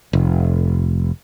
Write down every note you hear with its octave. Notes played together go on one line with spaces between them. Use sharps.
F1